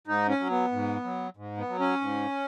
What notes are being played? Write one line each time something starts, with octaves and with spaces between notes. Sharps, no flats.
G#2 D#4
C#4
F#3
B3
G#2
F#3
G#2
B3
F#3
C#4
G#2